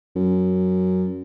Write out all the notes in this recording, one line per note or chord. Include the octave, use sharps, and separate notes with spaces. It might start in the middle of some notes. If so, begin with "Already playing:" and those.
F#2